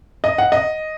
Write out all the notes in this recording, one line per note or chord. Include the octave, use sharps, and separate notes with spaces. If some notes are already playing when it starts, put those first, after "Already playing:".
D#5
F#5
D#5